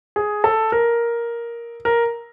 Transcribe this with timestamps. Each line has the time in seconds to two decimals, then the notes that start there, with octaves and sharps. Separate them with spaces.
0.16 G#4
0.44 A4
0.72 A#4
1.85 A#4